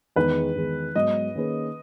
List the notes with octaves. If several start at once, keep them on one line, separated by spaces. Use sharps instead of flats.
E2 D#3 G#3 D#4 B4
E2 D#3 G#3
G#2 F#3 B3 D#5
D#3 A#3 C#4 G#4 B4